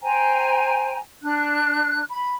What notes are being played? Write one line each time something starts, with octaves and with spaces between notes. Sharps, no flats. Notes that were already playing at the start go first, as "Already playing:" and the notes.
C5 G5 G#5 A#5
D4 F#6
B5